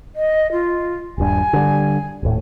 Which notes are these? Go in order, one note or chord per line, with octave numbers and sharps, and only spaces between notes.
D#5
F4
D#1 G2 G#5
D3 G3
D#1 A2